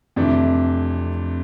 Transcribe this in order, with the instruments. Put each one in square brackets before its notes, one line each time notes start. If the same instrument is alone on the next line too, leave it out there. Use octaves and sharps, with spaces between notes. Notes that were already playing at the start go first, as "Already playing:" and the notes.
[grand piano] F2 C3 E3 A3 D4